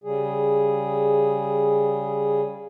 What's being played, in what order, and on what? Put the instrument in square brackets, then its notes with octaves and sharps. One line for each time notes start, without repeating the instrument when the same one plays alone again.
[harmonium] C#3 G3 G#4